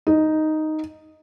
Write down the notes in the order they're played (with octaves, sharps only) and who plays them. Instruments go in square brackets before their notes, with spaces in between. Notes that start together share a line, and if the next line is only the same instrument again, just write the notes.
[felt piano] D#4